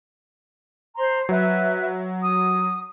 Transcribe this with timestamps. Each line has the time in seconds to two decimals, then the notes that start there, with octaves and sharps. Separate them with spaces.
0.96 C5 A#5 C6
1.29 F#3 B4 E5
2.21 D#6